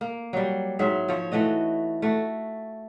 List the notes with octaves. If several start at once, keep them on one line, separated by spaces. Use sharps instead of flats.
A#3
F#3 G3
G#2 F#3 E5
F3 C#5
E3 A3 F#4 D#5
A3 F#4